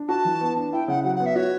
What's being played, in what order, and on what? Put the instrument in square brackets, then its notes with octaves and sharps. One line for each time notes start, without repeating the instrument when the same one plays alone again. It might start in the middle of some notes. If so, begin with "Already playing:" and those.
Already playing: [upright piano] D4
[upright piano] F#4 [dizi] A5
[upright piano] E3
B3
D4
[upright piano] E4 [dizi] G5
[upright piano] C#3 [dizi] F#5
[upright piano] F#3 [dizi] F#5
[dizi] F#5
[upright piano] B3
[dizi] E5
[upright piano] F#4 [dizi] C#5